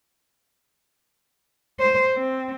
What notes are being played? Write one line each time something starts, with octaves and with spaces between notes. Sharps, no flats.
C5
C4